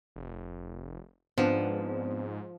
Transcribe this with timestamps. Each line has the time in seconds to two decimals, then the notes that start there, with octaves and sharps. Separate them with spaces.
0.16 F1
1.38 G#2 F3 B3 C4 D4